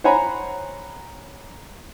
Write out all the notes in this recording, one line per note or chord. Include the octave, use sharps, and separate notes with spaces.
C5 C#5 F#5 G#5 A#5 B5